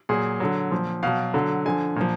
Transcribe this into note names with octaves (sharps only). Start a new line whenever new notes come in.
A#2 F#3 G#4
D3 F#3
A#2 F3
B2 F#3 F5
D3 F#3
D3 F3 G#5
A#2 F3